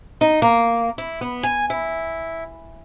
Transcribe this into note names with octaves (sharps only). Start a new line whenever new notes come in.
D#4
A#3
E4
B3
G#5
E4